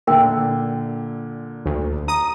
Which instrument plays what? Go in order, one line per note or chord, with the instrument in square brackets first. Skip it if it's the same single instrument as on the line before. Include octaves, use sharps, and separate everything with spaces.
[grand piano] A#2 D3 [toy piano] A#4 E5 G5
[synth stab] D2
[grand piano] A#5 [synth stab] D#6